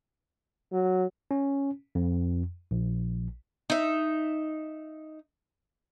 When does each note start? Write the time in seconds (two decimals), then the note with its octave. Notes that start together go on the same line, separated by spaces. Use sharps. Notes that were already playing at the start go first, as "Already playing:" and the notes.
0.72 F#3
1.31 C#4
1.95 F2
2.71 A#1
3.70 D#4 E5